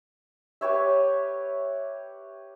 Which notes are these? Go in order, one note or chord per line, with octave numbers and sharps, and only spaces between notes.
G4 B4 C#5 E5